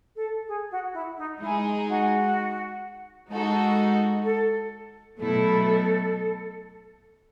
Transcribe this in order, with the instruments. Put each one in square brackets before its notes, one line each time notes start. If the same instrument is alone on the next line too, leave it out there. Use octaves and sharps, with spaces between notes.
[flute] A4
G#4
F#4
E4
D#4
[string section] G#3 D#4 G#4 [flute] E4
[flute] F#4
[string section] G#3 D#4 F#4 A4
[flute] A4
[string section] B2 F#3 A3 E4 [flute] A4